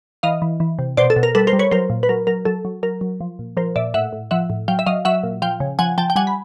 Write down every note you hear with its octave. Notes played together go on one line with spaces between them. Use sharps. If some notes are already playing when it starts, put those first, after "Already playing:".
E3 D#5 F5
E3
E3
C3
B2 C5 D5
A4
B2
A#4
G3 A4 B4
A#4 C5
G3
B4 C#5
F#3 A#4 C5
A#2
B4
F#3 A#4
F#3 A#4
F#3 A4
F#3
F#3 A#4
F#3
F3
A#2
F3 A#4 C5
A#2 D5 E5
A2 E5 F#5
A2
F3 E5 F#5
A2
F#3 F5 G5
E5
F#3 D#5 F5
F#3 E5 F#5
A#2
F3 F5 G5
C#3
F3 F#5 G#5
F3 G5 A5
G5
G3 F#5 G#5
B5